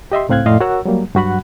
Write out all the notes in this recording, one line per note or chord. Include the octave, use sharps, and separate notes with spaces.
G4 D#5 E5 C6
C#2 A2 C4 F5 F#6 G#6
F2 A2 D5 D#5 F5 C6
F#4 A#4 C#5 F#5 E6
F#3 G3 A#3
G2 F#3 F#4 F#5 B5 F#6